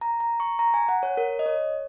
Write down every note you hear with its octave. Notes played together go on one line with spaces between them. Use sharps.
A#5
A#5
C#6
A#5
G#5
F#5
C#5
A#4
D#5
C#5